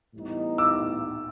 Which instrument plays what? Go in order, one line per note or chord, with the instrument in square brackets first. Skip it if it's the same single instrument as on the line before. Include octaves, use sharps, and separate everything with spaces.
[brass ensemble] A2 E3 G3 B3 D#4
[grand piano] D6 E6